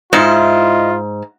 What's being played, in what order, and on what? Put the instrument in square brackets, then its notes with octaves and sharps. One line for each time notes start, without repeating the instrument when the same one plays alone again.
[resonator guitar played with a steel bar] G#2 [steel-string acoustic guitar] E4 D#5 [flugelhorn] F4